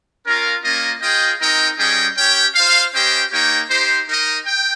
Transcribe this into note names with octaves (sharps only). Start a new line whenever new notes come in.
C#4 F4 A#4 F5
A#3 C#4 F4 A#4 D#5
F4 G#4 D#5 G5
C4 D#4 A#4 D#5 G5
G3 C#4 G#4 D#5 G5
C#4 G4 C#5 G5
F4 C5 F5
C#4 G4 C5 D#5 G5
A#3 D#4 G4 C#5 G5
D#4 G4 C5
D#4 A#4 D#5
G5